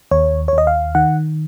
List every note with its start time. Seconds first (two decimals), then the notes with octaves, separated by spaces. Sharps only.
0.11 D#2 C#5
0.48 C#5
0.53 D#2 D#5
0.67 F5
0.95 D#3 F#5